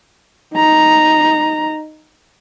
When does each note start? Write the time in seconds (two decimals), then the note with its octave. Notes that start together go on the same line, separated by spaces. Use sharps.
0.54 D#4 A#5